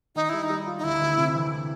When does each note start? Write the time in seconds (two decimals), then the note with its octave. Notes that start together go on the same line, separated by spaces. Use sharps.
0.15 D#3 D#4
0.29 G3 E4
0.43 D#4
0.50 G3
0.67 F4
0.79 D#4
0.84 D2 E4
1.02 D2
1.18 C3
1.35 E3